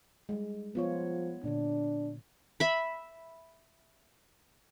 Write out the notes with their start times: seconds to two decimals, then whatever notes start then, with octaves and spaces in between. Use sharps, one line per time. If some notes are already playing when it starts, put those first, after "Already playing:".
0.29 G3 G#3
0.75 F3 B3 F4 C#5
1.44 A#2 D3 D4
2.60 E5 B5